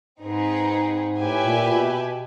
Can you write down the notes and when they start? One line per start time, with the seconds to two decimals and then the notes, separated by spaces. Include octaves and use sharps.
0.20 G#2 C4 D#4 G#4 B4
1.19 A2 G4 B4 E5 G#5
1.44 A#2
1.69 B2